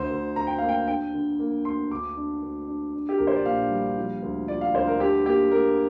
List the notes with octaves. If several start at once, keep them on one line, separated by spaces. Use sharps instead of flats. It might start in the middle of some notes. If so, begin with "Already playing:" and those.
Already playing: D2 C5
D2
D2 A#5
G5
A#3 F5
G5
D4 G5
D3
A#3
D2 C6
D2 D6
D4
D2
D4
D4
G4
A#1 A#4
C5
D5
A#2 F5
G3
F3
D2
F3 D5
F5
D2 C5
A#4
D3 G4
A#3 G4
A#3 A#4